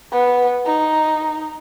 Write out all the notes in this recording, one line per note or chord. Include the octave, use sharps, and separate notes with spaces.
B3
D#4